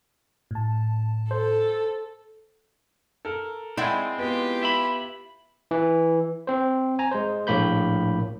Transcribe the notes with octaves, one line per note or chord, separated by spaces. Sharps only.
A2 A5
A4 C5
A4 A#4
G#3 C4 E4 D5 F#5 A6
B3 F4 G4
E5 B5
E3
C4 C5
G#5 A#5
G#3 C5
A#1 A2 A#3 B5 G6